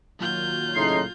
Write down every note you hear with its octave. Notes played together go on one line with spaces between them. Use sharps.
A#2 D#3 F#3 F4 G6
A2 C#3 D#4 C6